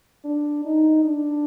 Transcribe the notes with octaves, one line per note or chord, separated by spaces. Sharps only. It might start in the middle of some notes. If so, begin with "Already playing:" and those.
D4
D#4
D4